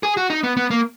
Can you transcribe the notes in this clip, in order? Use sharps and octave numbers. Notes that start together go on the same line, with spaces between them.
G#4
F#4
D#4
B3
B3
A#3